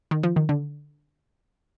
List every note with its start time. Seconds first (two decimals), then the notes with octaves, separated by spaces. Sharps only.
0.11 D#3
0.23 F3
0.36 D#3
0.49 D3